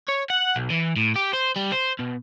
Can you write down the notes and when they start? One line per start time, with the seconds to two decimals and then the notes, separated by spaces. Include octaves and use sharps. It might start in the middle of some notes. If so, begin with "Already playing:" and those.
0.08 C#5
0.30 F#5
0.56 B1
0.70 E3
0.96 A2
1.16 G4
1.33 C5
1.56 G3
1.72 C5
1.99 B2